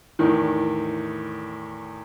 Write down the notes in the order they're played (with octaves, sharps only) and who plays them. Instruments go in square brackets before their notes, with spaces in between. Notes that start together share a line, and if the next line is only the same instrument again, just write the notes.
[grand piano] E2 A2 D#3